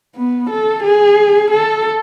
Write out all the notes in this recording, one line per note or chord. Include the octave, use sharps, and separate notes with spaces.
B3
A4
G#4
A4